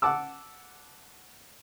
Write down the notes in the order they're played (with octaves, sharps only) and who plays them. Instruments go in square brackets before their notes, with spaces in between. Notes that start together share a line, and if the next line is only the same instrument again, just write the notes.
[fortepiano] F#5 A5 D6 E6